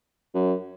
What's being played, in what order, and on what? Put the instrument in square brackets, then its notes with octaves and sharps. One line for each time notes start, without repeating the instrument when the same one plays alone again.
[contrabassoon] F#2